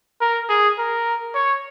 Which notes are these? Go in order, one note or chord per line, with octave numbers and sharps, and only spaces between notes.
A#4
G#4
A#4
C#5